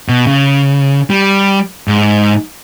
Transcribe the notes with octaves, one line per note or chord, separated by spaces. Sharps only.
B2
C#3
G3
G#2